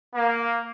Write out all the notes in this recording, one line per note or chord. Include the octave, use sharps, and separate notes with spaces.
A#3